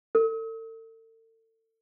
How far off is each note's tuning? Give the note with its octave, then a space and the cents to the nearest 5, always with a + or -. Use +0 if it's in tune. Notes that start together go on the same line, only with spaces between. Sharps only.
A4 +40